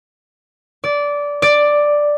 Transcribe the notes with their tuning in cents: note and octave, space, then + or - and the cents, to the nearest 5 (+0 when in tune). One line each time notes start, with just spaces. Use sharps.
D5 -15
D5 +5